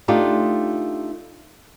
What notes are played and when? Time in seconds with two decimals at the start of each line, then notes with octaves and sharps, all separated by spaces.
0.08 A3 D4 D#4 F4 G4